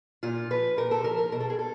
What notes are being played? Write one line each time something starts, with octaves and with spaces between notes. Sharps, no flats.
A#2 F4
F3 B4
A#2 A#4
A4
F3 A#4
A#4
B2 A#4
A4
G#4
A4